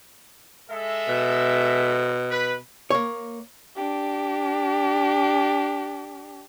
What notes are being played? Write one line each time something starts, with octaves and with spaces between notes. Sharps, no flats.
G#3 A4 E5
B2
B4
A#3 C#5
D4 G4